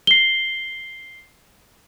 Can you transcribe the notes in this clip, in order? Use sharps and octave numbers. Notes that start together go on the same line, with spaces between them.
C7 G7